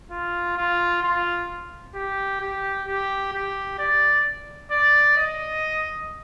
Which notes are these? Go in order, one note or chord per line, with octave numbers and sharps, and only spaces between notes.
F4
F4
F4
G4
G4
G4
G4
D5
D5
D#5